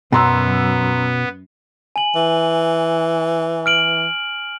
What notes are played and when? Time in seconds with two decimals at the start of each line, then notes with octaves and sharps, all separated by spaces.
0.12 F#2 B2 B3 A#5 C6 E6
1.96 G#5 F#7
2.16 E3
3.66 F6 D7 F#7